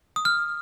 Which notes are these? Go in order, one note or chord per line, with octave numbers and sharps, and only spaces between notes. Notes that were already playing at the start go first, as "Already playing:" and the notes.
D#6
F6